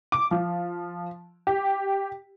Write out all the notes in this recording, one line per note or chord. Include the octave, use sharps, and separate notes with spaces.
D6
F3
G4